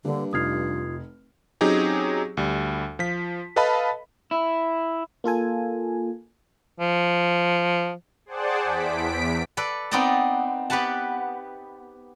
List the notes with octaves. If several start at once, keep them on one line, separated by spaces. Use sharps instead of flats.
G2 D3 A#3 B4
F1 D#4 F4 D#6 F6 G#6 C7
F#3 C4 C#4 D#4 G4 G#4
D2 G3
F3 F4 B6
A4 B4 D#5 F5 A5 B5
E4
A#3 F4 A4 G#5
F3
G#4 C5 D5 F#5 G5 A5
E2 B6 D7
A4 B4 D5
B3 C4 D#4 D5 D#5 A5
B3 G4 B4 F#5 A5